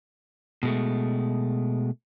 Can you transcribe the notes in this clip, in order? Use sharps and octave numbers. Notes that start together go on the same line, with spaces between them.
B2 G#3 A3